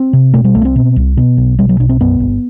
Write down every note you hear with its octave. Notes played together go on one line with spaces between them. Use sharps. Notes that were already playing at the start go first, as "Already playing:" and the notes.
Already playing: C4
C3
B2 A3
G3
C2 A3
B3
C4
B2
C2
B2 B3
B1
B2 G3
F#3
B1 D4
C4
F#2 B3
G1